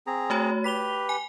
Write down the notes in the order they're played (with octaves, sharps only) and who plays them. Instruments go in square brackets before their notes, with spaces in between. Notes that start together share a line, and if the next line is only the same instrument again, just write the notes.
[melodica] C4 G#4 A#5
[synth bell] A3 F#4 C#5
[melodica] G4 B4 [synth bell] B6 F7 G7
[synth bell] G#5